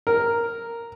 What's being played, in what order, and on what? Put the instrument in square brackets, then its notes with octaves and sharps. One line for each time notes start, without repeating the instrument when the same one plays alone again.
[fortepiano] A#4